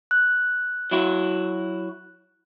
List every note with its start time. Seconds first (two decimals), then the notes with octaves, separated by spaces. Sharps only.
0.11 F#6
0.91 F#3 E4 F#4